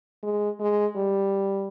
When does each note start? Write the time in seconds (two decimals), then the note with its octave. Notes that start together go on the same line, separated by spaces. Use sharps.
0.23 G#3
0.60 G#3
0.96 G3